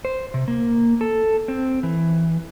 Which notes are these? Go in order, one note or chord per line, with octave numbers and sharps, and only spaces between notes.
C5
C3
A#3
A4
C4
E3